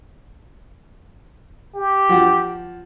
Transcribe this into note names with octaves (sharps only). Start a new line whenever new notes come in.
G4
F3 F#4